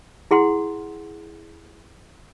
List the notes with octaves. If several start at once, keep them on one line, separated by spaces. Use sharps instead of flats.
E4 G#4 F#5 C6